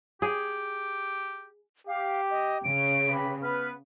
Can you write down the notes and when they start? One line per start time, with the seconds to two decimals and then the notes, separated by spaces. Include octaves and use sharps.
0.22 G4 G#4
1.87 G4 F5
2.30 D#5
2.64 C#3 D7
3.09 G4 B4 B5
3.43 B3 B4 F6